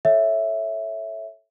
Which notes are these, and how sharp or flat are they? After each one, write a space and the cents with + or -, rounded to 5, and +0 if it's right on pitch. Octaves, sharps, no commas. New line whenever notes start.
A4 +0 C#5 +0 E5 +0